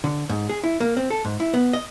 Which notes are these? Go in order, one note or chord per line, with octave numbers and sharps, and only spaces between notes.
D3
G#2
G#4
E4
A#3
C4
A4
G#2
E4
B3
D#5